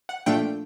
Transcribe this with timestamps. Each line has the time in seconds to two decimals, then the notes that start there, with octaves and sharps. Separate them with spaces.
0.09 F#5
0.26 A#2 F3 A3 D4 F4 G5